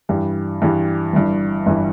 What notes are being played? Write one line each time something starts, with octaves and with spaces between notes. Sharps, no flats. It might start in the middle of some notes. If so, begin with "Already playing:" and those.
G2 E3 G3
G2 E3 G3
G1 G2 E3
G1 G2 E3